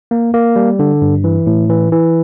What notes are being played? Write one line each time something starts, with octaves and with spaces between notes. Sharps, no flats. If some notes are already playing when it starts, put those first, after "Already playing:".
A#3
A#3
G3
D3
G2
E3
A2
E3
E3